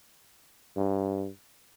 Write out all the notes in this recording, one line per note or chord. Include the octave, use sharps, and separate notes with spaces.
G2